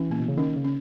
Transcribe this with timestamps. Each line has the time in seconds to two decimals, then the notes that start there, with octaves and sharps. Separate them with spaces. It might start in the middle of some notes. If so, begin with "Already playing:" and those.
Already playing: E3 C#4
0.10 A#2 A#3
0.20 B2
0.28 C#3
0.38 D#3 C#4
0.56 C#3
0.64 C#4